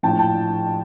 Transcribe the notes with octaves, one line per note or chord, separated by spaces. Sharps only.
A#1 A2 F3 G5 A5
G5 A5